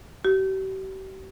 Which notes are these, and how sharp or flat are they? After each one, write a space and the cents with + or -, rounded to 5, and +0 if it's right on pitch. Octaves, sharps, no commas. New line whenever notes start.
G4 -45